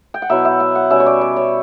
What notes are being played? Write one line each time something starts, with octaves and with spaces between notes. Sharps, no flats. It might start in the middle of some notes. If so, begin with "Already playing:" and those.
G5
F#5
B2 F#3 B3 E4 E5
E5
F#5
F#5
B2 G3 C#4 E5
C#5
D5
D5
C#5